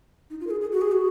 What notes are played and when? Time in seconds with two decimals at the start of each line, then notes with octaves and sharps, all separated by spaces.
0.30 D#4
0.40 F4
0.47 A#4
0.50 G#4
0.61 G#4
0.72 F#4
0.81 G#4
0.92 F#4